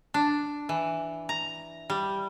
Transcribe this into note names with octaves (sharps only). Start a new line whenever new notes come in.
D4
E3
A#5
G3